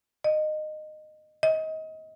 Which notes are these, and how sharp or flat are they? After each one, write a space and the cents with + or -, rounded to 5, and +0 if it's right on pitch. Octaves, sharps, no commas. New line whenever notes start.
D#5 -20
D#5 +25